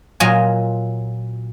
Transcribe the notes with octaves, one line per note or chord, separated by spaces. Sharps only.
A#2 F#3 F4 D#5 G#5